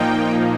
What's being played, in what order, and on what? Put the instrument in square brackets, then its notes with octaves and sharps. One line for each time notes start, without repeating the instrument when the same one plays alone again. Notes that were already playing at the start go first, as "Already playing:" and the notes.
Already playing: [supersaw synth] A#2 F3 A#3 D#4 G5